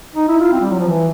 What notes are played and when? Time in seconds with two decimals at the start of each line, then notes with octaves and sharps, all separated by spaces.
0.16 D#4
0.28 E4
0.40 F4
0.52 C4
0.61 G3
0.70 F#3
0.79 F3
0.88 E3